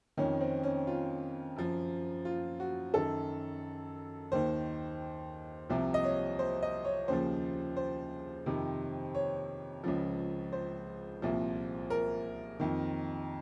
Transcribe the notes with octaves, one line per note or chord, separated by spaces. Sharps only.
F2 D#3 C#4
C4
C#4
F4
F#2 F3
F4
F#4
F#2 D#3 A4
D#2 D#3 C5
C2 C3 F3
D#5
C#5
C5
D#5
C#5
D#2 C#3 F3 C5
C5
F2 C3 D#3
C#5
C#2 C#3 F3
C5
C2 A#2 F3
A#4
F2 D#3